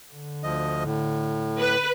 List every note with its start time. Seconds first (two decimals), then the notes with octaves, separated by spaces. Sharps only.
0.13 D3
0.43 D2 F3 D#5
0.85 A2
1.59 B4